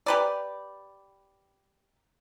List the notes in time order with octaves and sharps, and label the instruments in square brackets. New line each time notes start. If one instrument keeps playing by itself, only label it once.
[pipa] G4 B4 D5